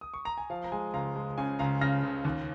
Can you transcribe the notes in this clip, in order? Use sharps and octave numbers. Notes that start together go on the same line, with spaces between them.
D#6
C#6
A#5
G#5
F3 F5
A#5
G#3 G#5
C#2 F5 A#5
G#3
C#3 G#5
C#2 F5 A#5
C#3 F6 A#6
C#2
D#2